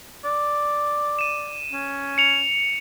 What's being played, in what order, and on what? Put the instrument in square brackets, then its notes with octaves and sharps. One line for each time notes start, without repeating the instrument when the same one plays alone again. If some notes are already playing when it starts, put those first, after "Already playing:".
[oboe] D5
[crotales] D#7 E7
[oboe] C#4
[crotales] C#7 F7